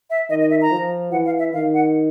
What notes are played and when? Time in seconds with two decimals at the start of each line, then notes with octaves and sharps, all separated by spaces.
0.10 E5
0.30 D#3 D#5
0.41 D#5
0.50 E5
0.62 A#5
0.71 F3
1.12 E3 F#5
1.26 F5
1.39 E5
1.53 D#3 F5
1.74 F#5